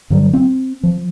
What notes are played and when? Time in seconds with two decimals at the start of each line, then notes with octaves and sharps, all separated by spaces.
0.10 G2 D3 F#3 G3
0.33 C4
0.83 F3